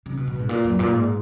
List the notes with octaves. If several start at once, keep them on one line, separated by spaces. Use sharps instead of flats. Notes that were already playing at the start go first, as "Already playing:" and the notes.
C#3
B2
B2
G#2
A#2
F#2
A#2
G#2